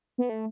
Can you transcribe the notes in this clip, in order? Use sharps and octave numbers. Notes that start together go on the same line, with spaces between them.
B3
A3